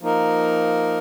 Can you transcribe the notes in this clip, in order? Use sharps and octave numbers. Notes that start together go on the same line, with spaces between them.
F3 A#3 D#4 A#4